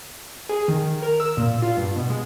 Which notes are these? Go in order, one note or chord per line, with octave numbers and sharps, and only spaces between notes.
G#4
D#3
A#4
E6
A#2
F4
G2
B2
G#3